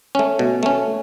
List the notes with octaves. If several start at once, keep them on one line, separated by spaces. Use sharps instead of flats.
A3 C#4
B2
A3 C#4